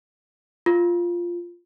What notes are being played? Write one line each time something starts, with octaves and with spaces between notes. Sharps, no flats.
F4